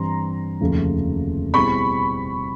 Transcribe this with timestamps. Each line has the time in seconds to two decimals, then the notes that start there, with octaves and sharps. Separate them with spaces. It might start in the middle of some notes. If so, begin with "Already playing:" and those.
Already playing: G2 E3 G3 C4 A#5 C6
0.61 F1 D#2 C#3 F3 A3
1.54 B2 G3 C4 E4 G#4 B5 C#6